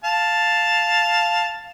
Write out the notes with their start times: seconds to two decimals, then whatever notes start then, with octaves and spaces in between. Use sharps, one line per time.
0.04 F5 A5